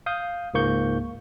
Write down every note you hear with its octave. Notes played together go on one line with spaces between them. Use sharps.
F5 D#6 G6
C#2 G#2 A#3 C#6 G6